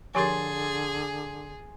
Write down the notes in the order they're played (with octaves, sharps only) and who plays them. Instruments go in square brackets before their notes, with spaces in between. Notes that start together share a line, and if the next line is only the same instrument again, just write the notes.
[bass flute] D3 [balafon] F3 G4 A#4 [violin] G#4 [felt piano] G#5 C6 A6